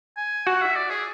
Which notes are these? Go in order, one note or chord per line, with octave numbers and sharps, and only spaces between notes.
G#5
F#4 F#5
E5
D5
G#4